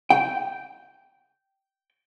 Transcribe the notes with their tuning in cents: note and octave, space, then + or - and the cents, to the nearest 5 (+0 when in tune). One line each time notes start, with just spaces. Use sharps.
G5 -10